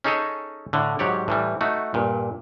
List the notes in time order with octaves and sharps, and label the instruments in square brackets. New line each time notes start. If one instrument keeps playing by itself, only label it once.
[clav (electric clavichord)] C#4 D#4 G#4 A4 C#5 D#5
A2 D3
G#2 F#3 G4 C#5 D5
A2 E3 G3
A3 D#4 F#4
G2 A#2